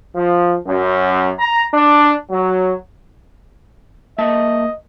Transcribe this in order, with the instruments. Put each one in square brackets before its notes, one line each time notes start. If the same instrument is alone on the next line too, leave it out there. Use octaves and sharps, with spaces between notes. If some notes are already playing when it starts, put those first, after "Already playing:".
[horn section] F3
F#2
A#5
D4
F#3
[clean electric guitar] A#3 E5 A5 [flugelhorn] D#5